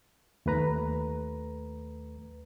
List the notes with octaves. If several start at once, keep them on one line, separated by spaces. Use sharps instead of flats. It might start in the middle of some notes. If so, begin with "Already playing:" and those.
D#2 A3 B4 A#5